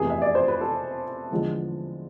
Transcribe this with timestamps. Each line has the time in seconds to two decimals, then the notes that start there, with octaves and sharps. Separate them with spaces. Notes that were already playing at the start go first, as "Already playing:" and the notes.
Already playing: F1 E2 C3 G#4
0.10 E5
0.22 D5
0.35 C5
0.48 B4
0.61 A4
1.30 E2 D3 F3 G#3